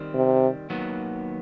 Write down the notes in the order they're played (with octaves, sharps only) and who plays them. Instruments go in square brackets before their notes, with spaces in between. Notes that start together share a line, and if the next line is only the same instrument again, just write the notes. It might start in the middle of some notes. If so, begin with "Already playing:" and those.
Already playing: [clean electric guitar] D#3 G3 C4
[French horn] C3
[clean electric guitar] D#2 D#3 F#3 B3